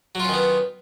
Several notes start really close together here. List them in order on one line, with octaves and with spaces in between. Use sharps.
F#3 F4 C#4 D#3 B3